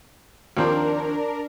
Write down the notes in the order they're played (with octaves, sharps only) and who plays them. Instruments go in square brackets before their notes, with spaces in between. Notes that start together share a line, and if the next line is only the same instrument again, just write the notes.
[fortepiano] D#2 F3 C4 [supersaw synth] D4 A#4